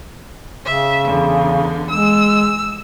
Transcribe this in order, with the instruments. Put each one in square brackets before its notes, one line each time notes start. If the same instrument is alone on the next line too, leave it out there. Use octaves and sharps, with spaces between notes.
[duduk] C#3 [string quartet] E5
[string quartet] E2 D3
[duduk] G#3 [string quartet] E6